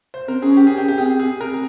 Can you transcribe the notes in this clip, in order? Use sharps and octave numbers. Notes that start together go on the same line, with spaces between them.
C5
C4 A#4
C#4 G#4
G4
G#4
G4
G4
C4 G#4
G#4
A#4